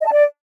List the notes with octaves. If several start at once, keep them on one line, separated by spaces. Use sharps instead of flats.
D#5
A5
D5